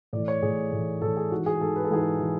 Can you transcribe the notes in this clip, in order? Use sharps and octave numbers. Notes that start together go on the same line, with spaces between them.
A2 E3 D5
C#5
A2 E3 G#4
A2 E3
A2 E3 A4
G#4
G#2 E3 F#4
G#4
G#2 E3 A4
B4
A4
G#2 E3 G#4
A4
E3